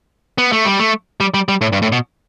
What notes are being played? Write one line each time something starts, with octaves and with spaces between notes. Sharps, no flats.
B3
A3
G3
A3
G3
G3
G3
A2
G2
A2
B2